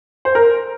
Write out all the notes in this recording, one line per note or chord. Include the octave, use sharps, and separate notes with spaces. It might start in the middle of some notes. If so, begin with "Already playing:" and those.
C5
A#4